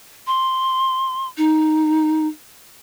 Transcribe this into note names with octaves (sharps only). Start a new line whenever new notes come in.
C6
D#4